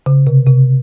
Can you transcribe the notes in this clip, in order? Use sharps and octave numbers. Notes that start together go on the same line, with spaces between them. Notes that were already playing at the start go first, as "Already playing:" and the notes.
C#3
C3
C3